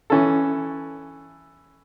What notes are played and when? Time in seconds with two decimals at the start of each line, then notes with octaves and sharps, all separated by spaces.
0.10 E3 C#4 A4